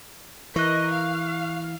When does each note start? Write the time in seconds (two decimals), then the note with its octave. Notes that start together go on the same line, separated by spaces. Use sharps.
0.56 E3 A#4 D#5 C#6 F#6
0.93 F5